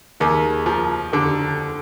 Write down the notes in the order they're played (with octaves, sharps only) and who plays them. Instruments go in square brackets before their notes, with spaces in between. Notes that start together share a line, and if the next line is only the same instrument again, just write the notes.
[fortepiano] D#2 [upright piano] G#4 A#4
[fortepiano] F3
[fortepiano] D3 [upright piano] G4 A4